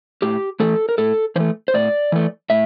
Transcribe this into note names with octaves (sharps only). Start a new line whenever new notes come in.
A2 G4
E3 A3 A4
A#4
A2 A4
E3 A3 C5
C5
A2 D5
E3 A3
A2 E5